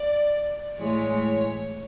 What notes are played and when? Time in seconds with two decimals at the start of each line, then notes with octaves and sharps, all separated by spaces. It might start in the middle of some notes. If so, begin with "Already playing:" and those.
Already playing: D5
0.78 A2 E3 G#3 C#5